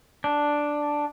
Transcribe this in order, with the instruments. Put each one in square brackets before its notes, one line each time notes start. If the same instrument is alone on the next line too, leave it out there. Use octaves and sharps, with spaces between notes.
[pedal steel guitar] D4